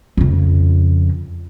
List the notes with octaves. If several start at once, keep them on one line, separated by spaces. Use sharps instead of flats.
F2 C#3